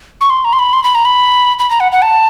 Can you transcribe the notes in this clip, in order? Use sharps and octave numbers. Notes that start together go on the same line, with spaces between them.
C#6
C6
A#5
C6
B5
C6
B5
A#5
B5
B5
A#5
F#5
F#5
A5